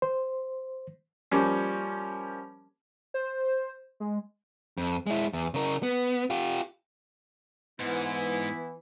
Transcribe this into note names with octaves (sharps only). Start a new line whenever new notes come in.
C5
F3 G3 A#3 C#4
C5
G#3
F2
G#3 E4
E2
C#3 A#4
B3
F4 G4
G#2 E3 B3 E4